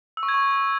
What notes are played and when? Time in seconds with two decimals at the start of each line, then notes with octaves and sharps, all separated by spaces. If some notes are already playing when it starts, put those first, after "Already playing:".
0.17 E6
0.23 C#6
0.28 G#6
0.34 C#6